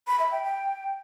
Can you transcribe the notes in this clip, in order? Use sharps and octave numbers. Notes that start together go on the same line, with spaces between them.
B5
E5
G5
G5